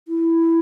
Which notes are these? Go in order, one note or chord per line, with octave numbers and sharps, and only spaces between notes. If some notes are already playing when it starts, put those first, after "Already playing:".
E4